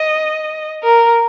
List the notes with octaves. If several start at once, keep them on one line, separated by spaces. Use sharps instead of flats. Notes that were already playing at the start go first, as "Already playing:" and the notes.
Already playing: D#5
A#4